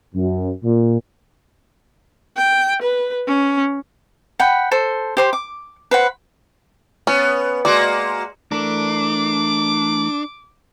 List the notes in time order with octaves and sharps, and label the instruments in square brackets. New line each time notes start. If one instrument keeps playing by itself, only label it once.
[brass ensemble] F#2
A#2
[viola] G5
B4
C#4
[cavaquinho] F#5 G5 B5
A4 C5
G4 C5 C6
D6
B4 C5 F#5
[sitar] B3 [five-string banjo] C#4
[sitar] G#3 A#3 F#4 [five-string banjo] D5
[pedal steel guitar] E3 A3 A#4 [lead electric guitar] D4 [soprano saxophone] D6